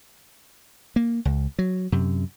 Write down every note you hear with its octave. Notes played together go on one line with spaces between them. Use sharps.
A#3
C#2
F#3
F#2 C3